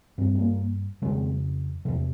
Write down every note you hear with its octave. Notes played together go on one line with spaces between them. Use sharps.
G2 C4
C4
A#3
F2 C#3 G#3
E2 C3 F3